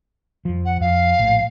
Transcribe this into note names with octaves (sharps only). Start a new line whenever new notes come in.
F2 F3
F#5
F2 F5
A#1 A2